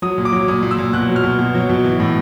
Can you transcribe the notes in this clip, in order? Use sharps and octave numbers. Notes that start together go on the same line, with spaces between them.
F#3 D#6
A#2
D6
F#3
A#2 D#6
A#2
E6
A#2
B2 F#6
F#3
F6
B2
B2
F#3
B2
E3
A2